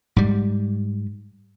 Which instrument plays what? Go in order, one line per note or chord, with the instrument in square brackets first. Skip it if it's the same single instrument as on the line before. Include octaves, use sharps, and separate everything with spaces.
[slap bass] G#2 G3